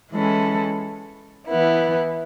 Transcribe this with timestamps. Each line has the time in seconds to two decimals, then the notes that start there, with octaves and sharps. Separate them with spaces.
0.11 E3 G#3 C#4 E4 A4
1.47 E3 B3 E4